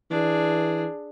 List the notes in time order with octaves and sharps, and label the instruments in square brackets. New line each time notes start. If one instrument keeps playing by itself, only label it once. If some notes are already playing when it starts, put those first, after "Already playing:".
[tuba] E3 [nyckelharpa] D4 G#4